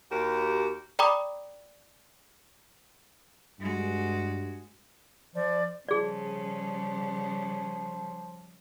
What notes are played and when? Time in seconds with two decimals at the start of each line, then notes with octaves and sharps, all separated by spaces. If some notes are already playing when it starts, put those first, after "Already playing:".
0.11 D#2 F#4 G4 A#4
0.99 D5 G5 A#5 B5 D6 D#6
3.60 G2 G#3 F#4
5.36 F3 D5
5.89 C#3 F3 G3 G#4 D5